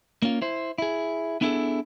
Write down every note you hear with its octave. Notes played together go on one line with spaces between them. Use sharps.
A#3 C#4 F4
E4 C5
E4 G#4
B3 D4 E4 F4 G#4 A4